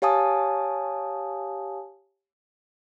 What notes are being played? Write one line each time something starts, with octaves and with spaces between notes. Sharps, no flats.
G4 C#5 F5 G#5 A5 D#6